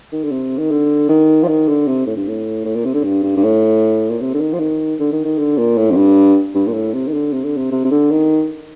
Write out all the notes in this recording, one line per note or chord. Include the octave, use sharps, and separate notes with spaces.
D#3
D3
C3
D#3
D3
D#3
F3
D#3
D3
C3
A2
G2
A2
A2
A#2
C3
D3
G2
G2
G2
A2
A#2
C3
D3
D#3
F3
D#3
D3
D#3
D#3
D3
A#2
A2
F2
G2
G2
A#2
A2
C3
D#3
D3
C3
D3
C3
C3
C3
D3
D#3